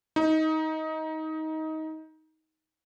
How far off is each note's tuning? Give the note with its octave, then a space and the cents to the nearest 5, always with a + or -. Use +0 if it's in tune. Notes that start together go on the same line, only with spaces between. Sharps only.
D#4 +20